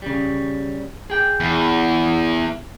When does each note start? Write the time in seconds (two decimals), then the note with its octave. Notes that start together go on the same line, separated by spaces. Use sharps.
0.02 C#3 G3
1.10 G#4 G5
1.40 E2